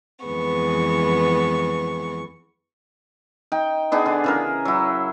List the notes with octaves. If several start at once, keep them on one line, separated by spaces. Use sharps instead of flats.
F2 E3 G#3 B3 C#6
D#4 G5
B3 D4 D#4 G#4
D3
C#3 E3 A#4
F#3 E4